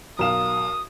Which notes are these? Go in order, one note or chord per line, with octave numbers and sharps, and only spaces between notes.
B1 A#4 F5 D#6 E7